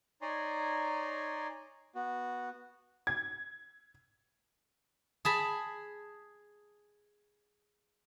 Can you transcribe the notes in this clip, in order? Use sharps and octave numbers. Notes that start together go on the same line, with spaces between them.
D#4 C#5 D5 G#5 A#5 C6
B3 F#4
G#6
G#4 A5 B5